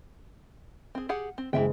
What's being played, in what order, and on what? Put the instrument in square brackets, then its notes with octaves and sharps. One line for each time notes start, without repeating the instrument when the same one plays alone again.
[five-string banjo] C4 G#4
G4 G#4 F#5
C4
[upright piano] F#1 G#3 [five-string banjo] E3 E5 G5